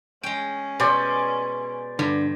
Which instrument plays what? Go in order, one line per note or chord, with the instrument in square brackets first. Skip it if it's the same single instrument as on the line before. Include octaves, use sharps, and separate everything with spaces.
[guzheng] G#3 G5 [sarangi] C#4
[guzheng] B2 [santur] C5 D5 G#5
[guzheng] G2 [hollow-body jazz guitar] D3